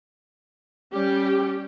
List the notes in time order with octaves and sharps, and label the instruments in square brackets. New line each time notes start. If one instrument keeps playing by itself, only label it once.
[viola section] G3 C#4 G4